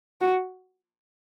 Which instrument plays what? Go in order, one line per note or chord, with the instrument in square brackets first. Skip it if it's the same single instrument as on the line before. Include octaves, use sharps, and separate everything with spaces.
[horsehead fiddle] F#4